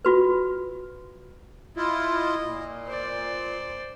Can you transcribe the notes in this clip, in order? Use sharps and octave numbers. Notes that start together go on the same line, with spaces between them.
F4 F#4 B4
E4 F4 D#5
D#5
A#2
C5 D5